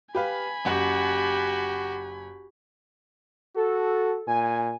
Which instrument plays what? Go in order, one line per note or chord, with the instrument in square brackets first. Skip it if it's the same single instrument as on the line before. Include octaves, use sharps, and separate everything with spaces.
[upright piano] G4 B4 F5 [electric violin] G#5 B5
[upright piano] F#1 F#5 [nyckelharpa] F#4 G4
[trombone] F#4 [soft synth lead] A4
[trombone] A#2 [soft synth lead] G#5